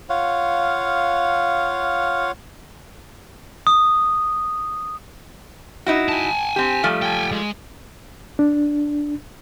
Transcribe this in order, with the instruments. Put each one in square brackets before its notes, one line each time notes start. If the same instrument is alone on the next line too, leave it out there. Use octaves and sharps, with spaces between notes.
[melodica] F4 C#5 F5 F#5
[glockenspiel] D#6
[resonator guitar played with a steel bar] D#4 E4 F#4
[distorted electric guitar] G#5 A5
[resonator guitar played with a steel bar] C4 G4
F3 G3 A3
[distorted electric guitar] G5 G#5
G#3
[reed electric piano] D4